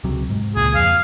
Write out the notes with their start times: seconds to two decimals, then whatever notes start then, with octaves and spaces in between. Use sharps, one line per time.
0.04 C#2 C3 F#3
0.30 G#2
0.56 C#2 A#2 G#4
0.75 F2 F5